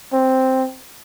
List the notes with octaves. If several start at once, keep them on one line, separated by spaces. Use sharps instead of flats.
C4